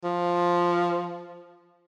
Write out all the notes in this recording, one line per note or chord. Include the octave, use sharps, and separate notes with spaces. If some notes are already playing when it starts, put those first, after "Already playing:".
F3